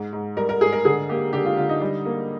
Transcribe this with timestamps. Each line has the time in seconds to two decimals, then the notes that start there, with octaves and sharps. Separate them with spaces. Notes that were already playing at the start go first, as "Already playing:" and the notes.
Already playing: G#2
0.13 G#2
0.37 G3 A#4
0.49 A#4
0.61 G#2 G#4
0.72 A#4
0.85 D3 G#4
1.09 A#3 G4
1.33 D3 G4
1.45 F4
1.57 D3 F4
1.69 D#4
1.81 G3
2.05 A#3